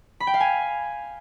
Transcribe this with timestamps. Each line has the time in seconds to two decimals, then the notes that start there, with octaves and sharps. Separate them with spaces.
0.20 B5
0.27 G5
0.34 F5
0.40 G#5